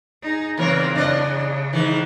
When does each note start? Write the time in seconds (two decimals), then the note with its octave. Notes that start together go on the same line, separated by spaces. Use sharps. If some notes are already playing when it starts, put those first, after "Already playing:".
0.22 D#4 G#4
0.58 E2 C#3 C4 A#4 C#5
0.96 C#3 D4 D5 D#5
1.73 G#2 D#3 E3